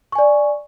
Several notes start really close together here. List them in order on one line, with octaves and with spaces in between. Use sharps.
C#6 G#5 D5